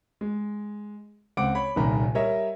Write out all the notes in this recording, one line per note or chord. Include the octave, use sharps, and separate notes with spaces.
G#3
C#2 C4 F#5 D6 D7
C#5 B5
D#1 C2 D#3 A#5 B5
G3 A#4 C#5 D#5 E5